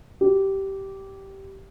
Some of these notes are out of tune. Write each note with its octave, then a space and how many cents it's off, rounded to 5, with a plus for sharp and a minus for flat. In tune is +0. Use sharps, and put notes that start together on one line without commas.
G4 -15